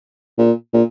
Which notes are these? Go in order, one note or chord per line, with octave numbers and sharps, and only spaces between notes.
A#2
A#2